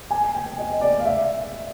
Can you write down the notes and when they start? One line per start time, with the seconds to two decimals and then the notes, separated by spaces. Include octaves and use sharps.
0.11 G#5
0.35 G5
0.58 D#5
0.81 D5
1.00 F5
1.05 E5